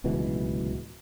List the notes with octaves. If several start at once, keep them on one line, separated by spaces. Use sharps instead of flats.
D1 C#2 B2 E3